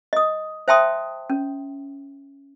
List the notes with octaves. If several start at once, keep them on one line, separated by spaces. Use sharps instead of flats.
D#5 D#6
C5 E5 G5 A5 C6 D#6
C#4